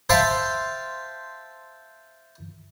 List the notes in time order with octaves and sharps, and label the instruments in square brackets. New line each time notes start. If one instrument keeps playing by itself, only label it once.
[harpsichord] C5 E5 F5 G5 A5 C6